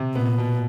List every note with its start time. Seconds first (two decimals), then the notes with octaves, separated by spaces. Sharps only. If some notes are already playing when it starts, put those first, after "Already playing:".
Already playing: C3
0.16 A#2 B3
0.38 B2